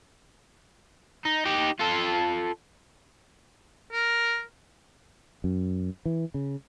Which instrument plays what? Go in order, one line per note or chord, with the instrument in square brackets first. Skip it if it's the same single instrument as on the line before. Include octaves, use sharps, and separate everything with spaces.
[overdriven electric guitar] D#4
D#4 G4
F4 A4
[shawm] A#4
[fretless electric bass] F#2
E3
C#3